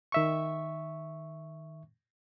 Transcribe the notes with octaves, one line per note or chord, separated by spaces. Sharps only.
D#3 E5 C#6